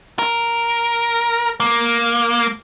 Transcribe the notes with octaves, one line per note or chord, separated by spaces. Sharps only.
A#4
A#3